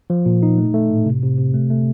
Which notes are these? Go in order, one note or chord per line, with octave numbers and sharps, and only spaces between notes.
F3
A#2
D#4
A3
A3
A2
C3
C3
C3
A3
A3